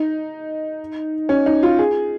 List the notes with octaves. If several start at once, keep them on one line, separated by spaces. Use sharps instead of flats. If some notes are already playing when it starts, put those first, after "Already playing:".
Already playing: D#4
C#4
D#4
F4
G#4